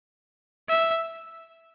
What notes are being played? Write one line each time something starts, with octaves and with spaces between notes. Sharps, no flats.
E5